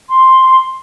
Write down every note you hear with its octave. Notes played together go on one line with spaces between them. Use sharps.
C6